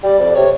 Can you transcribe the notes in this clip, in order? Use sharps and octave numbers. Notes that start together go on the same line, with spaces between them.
G3 D5
F2
C3 C#5